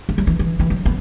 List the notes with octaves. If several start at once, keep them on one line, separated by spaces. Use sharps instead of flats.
E3
F#3
E3
E3
E3
F#3
B3